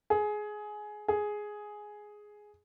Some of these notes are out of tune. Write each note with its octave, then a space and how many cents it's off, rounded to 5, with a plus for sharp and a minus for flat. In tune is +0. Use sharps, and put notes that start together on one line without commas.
G#4 +15
G#4 +5